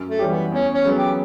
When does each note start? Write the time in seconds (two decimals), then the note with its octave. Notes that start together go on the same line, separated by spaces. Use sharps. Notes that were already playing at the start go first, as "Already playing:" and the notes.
Already playing: F#2
0.08 A3
0.19 E3 G3 C#4 G4
0.30 B3
0.52 E2 C#4
0.74 C#4
0.85 C#3 F#3 B3
0.96 G4